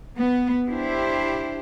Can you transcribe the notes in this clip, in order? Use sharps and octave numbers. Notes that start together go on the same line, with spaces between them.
B3
D4 E4 G4 C5